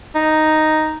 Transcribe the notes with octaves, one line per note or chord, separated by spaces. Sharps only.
D#4